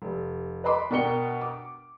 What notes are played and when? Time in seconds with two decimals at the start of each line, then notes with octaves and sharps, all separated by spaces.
0.02 F1
0.64 B4 D#5 B5 C6 D6
0.91 B2 D4 A#4 G5 C#7 G7
1.41 D6